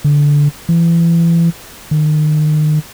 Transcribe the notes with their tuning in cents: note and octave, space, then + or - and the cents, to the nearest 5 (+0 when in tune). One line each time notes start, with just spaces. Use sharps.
D3 -15
E3 +30
D#3 -35